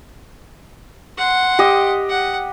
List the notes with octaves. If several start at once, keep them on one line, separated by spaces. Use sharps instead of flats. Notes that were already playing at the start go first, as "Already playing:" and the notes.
F#5 C6
G4 D#5 D#6
F#5